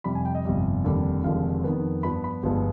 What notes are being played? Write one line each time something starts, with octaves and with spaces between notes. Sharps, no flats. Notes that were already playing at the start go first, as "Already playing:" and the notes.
F2 C3 G3 B5
G#5
G5
D#5
G1 F2 C3 G3
F1 D#2 D3 G3
F1 D#2 D3 F3 G#3 F5
F2 D#3 B3
G2 F3 B3 B5
B5
G1 G2 F3 G#3 B3